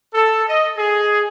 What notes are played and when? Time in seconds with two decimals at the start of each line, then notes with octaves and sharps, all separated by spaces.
0.14 A4
0.48 D#5
0.77 G#4